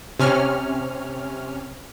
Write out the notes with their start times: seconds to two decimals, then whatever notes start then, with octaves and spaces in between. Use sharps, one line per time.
0.20 C3 C#4 F6